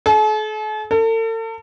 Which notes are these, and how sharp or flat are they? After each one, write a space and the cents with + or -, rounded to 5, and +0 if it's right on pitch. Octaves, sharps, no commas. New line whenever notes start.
A4 -45
A4 +40